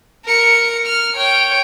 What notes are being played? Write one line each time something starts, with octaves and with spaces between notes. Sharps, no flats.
A#4 C#7
F6
C#5 G5